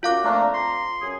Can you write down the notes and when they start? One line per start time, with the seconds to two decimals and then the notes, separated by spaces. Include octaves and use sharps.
0.03 F#2 F4 F5 F#5 D6
0.24 F2 A3 A#3 D4 C5 A#5
0.54 C6
1.00 F#2 G#4